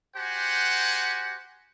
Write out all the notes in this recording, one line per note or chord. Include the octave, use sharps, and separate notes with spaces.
F#4 G4 C5 F#5 G#5